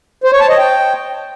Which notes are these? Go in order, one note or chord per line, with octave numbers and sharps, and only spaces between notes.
C5
C#5
A5
D#5
G5